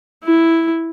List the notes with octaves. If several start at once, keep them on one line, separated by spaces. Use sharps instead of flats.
E4